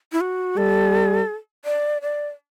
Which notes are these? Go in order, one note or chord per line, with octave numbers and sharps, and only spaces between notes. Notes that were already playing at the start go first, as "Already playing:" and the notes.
E4
F#4
G3 A4
D5
D5